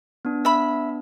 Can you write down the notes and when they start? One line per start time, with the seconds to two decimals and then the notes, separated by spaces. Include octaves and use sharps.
0.25 B3 D4
0.45 E5 B5